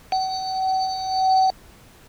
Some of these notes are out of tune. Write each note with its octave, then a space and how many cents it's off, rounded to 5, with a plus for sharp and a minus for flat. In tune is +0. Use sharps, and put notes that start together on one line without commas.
F#5 +40